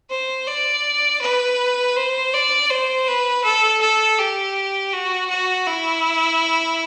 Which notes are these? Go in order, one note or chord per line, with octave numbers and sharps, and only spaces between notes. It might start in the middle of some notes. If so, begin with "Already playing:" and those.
C5
D5
B4
C5
D5
C5
B4
A4
A4
G4
F#4
F#4
E4